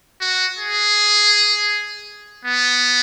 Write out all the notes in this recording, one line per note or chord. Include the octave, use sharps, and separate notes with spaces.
F#4
G#4
B3